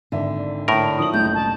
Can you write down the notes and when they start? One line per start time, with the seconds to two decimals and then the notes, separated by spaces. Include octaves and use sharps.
0.12 G#1 D3 D5 E5
0.68 A2 D3 D4 A#4
0.98 D#3 F3 D#6 F#7
1.13 F#1 C2 A3 G6
1.35 A5